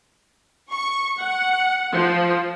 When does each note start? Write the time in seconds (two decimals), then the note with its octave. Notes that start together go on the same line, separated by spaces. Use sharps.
0.71 C#6
1.20 F#5
1.94 F3